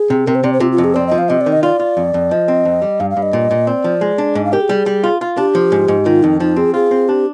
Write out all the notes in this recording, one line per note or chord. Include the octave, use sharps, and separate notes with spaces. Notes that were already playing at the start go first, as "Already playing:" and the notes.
Already playing: G#4
C3
C3 A#4
C5
C3 D5
C5
C3 F4
F4
F2
G#4
C4 D5
F3 D#5
F5
C3 D#5
D5
D#3
D#5
F4 D5
F4
F2
F2
F3 D#5
C4
F2
G3
G2 F5
F5
G2
D#5
A#2
A#2
C4 D5
F3
G#3
D4
G#2 D#5
F5
G4 A#4
G#4
G3
G3
F4
F4
D4 G4
F3
G#2
G#2
D#3 F4
F2 D#4
F3 D#4
C4 G#4
F4 G#4
C4
D4 G4